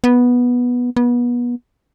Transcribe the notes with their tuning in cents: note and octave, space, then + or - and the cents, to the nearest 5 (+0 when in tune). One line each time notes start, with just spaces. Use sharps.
B3 -10
B3 -30